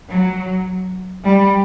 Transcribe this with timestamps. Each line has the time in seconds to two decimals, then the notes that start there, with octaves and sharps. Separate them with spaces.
0.09 F#3
1.24 G3